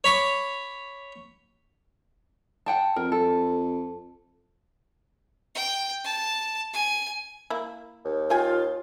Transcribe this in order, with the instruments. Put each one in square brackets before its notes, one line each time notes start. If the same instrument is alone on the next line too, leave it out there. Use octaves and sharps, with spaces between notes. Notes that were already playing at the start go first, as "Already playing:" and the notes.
[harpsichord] C#5 B5 C#6 D6
[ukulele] F#5 G5 A5
[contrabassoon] F2 [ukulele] A#4
[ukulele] A4
[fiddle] G5
A5
G#5
[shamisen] A#3 E4
[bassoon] D#2
[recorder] F4 [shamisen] D#5 G5 G#5